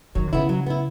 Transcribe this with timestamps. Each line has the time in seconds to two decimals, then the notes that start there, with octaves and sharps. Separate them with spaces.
0.15 D#3 F#3
0.27 C3
0.33 C#3 B3 E4
0.49 F#3
0.66 B3 E4